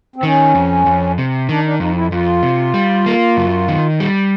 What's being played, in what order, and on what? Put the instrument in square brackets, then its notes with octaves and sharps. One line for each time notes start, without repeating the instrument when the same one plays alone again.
[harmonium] C4
[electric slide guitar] D#3 [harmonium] C#4
[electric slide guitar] F2
F2
C3
[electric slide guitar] D#3 [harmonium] D4
[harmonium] D4
[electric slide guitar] F2 [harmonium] D#4
[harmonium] E4
[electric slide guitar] F2 [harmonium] F4
[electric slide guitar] C3
G3
A#3
F#2
D#3
G3